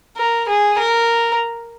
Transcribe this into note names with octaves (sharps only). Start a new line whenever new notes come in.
A#4
G#4
A#4